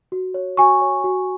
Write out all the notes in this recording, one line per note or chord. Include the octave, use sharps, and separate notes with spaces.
F#4
C#5
F#4 G#5 C#6
C#5
F#4